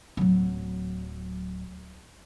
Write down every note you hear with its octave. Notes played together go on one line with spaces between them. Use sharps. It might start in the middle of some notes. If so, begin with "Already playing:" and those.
D1 F#3